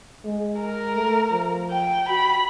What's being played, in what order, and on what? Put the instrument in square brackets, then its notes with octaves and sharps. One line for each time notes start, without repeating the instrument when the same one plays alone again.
[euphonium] G#3
[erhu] A#4
[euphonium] A3
F3
[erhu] G5
[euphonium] F#4 [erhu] B5